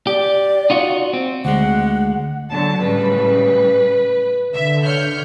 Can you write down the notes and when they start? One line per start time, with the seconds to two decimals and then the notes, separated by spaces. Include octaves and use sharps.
0.07 G4 D5
0.70 D#4 F4 F#4
1.13 C4
1.45 D2 G#3 F#5
2.51 D3 F#3 A5
2.82 A2 C#3 G3 B4
4.54 D3 E5
4.85 C#5 F6 G6